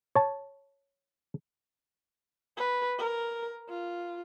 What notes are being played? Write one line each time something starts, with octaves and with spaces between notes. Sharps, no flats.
C#5 A5
B4
A#4
F4